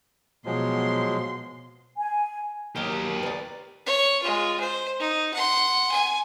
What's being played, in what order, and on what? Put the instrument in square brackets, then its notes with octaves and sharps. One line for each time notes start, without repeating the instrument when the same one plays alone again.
[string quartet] B2 C6 [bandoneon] F3 F#3 G#3
[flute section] G#5
[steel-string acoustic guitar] D#2 F#3 [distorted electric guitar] G4 A#4
[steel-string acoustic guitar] B4 D5
[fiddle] C#5
G#3 F4
C5
D#4
F#5 C6
G#5